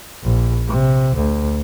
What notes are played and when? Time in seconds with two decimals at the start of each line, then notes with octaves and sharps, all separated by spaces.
0.24 A#1
0.67 C3
1.15 D2